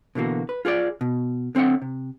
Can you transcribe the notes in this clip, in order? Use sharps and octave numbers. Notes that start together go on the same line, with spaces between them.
B2 D3 E3 A#3 F#4
B4
F4 G#4 B4 D5
B2
D3 C4 C#5 E5 F#5
C3